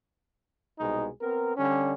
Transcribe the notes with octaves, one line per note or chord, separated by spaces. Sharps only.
C2 B2 G#3 D#4
B3 C4 A#4
D3 G3 C#4